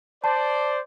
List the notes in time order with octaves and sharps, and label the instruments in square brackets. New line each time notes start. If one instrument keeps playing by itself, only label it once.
[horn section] C5 D5 [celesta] A5